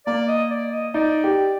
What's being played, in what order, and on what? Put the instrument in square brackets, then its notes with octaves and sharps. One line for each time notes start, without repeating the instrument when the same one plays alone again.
[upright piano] A#3 [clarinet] D5
[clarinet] D#5
D5
D#5
[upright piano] D#4 [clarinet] D5
[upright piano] G4